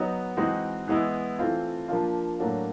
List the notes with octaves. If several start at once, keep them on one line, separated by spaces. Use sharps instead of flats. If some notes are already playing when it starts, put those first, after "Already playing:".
Already playing: F#3 B3 D#4 F#4
E3 G#3 C4 D#4 F#4
E3 G#3 B3 E4
E3 A3 C4 F4
F3 A#3 D4 F4
A2 F#3 A#3 D4 F#4